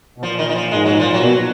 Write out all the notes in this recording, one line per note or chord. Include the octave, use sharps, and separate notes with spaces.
B2
A#2 F3
D#3
D#3
F3
G#2 G#3
F#3
A#2 F3
F#3
B2